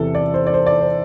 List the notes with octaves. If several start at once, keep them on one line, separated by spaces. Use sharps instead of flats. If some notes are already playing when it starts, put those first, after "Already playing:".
Already playing: E2 C3 E3 A4
D5
C5
D5
C5
D5
C5